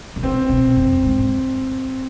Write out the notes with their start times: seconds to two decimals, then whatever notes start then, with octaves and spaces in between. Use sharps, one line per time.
0.16 C3
0.23 D3 C4
0.49 B2
0.76 F2
1.03 G#2